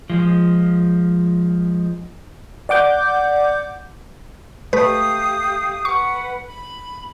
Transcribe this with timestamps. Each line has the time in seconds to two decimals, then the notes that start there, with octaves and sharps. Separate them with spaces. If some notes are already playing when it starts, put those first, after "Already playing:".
0.10 F3 G#3
2.69 D5 F#5 D6 G6
4.73 A3 G4 B4 F5 D#6
5.85 B4 F#5 C#6
6.46 B5